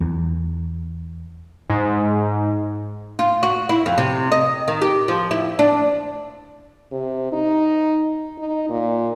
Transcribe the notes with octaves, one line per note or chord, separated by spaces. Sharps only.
E2
G#2
F4
F#4
E4
F2
C3
D#5
D#3
G4
F3
E4
D4
C3
D#4
D#4
A#2